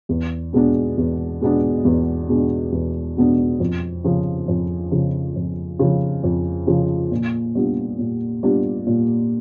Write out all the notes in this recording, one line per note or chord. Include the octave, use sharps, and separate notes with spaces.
E2
B2 G#3 B3 D4
E2
B2 G#3 B3 D4
E2
B2 G#3 B3 D4
E2
B2 G#3 B3 D4
F2
C#3 F3
F2
C#3 F3
F2
C#3 F3
F2
C#3 F3
A#2
G3 B3 D4 F4
A#2
G3 B3 D4 F4
A#2